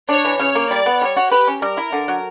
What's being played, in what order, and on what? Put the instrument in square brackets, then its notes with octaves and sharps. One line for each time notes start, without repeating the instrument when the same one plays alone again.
[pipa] D4 [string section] C#5
[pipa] E3
[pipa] C#3 [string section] C#5
[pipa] A#3
[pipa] G3 [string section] D5
[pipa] B3
[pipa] G3 [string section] C#5
[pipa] F#4
[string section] G4 [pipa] B4
[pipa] C#4
[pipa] G3 [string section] A#4
[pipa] E4
D3
F#3